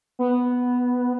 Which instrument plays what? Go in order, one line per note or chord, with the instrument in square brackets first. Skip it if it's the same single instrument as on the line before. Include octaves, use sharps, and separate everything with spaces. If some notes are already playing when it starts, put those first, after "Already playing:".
[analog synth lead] B3